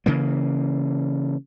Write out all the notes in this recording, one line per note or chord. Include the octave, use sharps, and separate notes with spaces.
C#3 E3 A#3